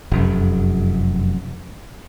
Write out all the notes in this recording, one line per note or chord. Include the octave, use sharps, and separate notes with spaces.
F1 F#2